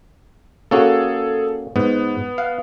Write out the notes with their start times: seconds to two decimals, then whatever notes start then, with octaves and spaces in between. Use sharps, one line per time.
0.71 A#3 C#4 F#4 G#4 A4
1.76 G#2 B3
2.38 F5 F#5